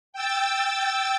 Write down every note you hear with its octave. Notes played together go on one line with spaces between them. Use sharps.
G5 E6 A6